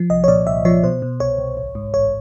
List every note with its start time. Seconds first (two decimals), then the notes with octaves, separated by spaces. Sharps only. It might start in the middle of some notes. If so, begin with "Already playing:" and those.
Already playing: F3
0.10 C2 D#5
0.24 C#5
0.28 A#2 D5
0.47 C2 E5
0.65 F3 C#5
0.83 B2 C5
1.02 B2
1.20 C2 C#5
1.38 C2
1.57 A1
1.75 G#2
1.94 A1 C#5